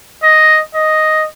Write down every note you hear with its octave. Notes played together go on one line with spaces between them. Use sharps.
D#5
D#5